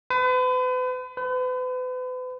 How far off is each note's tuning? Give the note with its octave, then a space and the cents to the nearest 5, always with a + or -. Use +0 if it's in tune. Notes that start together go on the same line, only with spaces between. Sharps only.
B4 +40
B4 +40